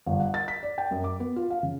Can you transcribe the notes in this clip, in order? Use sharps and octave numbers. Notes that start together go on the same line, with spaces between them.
G1
F#5
A6
B6
D5
G5
F#2
D6
B3
F4
F5
C#3